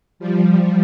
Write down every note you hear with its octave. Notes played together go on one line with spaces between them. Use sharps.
F3 G3